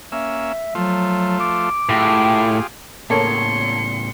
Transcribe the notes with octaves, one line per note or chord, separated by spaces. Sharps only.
A#3 C#4 E5 E6
F3 F#3 A3 F4
D6
A2 F4 G4 G#4
A2 C#3 A#3 A4 C#5 C6 C#7